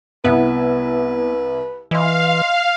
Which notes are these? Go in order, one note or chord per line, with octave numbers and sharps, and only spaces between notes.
C2 B3 E4 B4 E5
E3 D#5 F5 C6